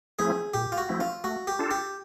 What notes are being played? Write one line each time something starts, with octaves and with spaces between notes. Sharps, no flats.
F3 A3 C4 E4 G#4
A#2 G4
F4
F#4
F3 A3 C4 E4
F4
A3 F#4
G4
D4 F4 A4
G4